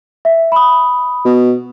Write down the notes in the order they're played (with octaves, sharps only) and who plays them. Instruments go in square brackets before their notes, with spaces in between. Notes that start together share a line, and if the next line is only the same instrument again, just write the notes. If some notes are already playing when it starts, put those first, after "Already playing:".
[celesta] E5
B5 D#6
[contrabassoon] B2